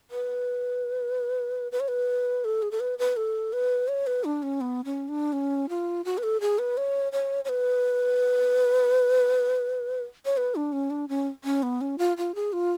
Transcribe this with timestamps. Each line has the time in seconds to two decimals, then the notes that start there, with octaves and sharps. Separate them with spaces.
0.11 B4
1.72 B4
1.80 C#5
1.88 B4
2.45 A4
2.62 G#4
2.71 A4
2.80 B4
2.99 B4
3.17 A4
3.53 B4
3.88 C#5
4.07 B4
4.24 D4
4.43 C#4
4.61 B3
4.85 C#4
5.09 D4
5.33 C#4
5.69 F4
6.05 F#4
6.18 B4
6.23 A4
6.41 G#4
6.59 B4
6.77 C#5
7.12 C#5
7.45 C#5
7.49 B4
10.25 C#5
10.37 B4
10.55 D4
10.72 C#4
10.90 D4
11.09 C#4
11.44 C#4
11.63 B3
11.81 C#4
11.98 F4
12.17 F4
12.35 G#4
12.53 F4